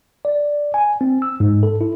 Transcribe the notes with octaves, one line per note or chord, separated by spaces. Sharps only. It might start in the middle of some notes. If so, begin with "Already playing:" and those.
D5
G#5
C4
E6
G#2
A4
E4